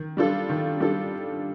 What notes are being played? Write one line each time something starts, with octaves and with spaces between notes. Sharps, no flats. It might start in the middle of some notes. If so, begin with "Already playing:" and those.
Already playing: D#3
G3 D4 F4 A4
D#3
G3 D4 F4 A4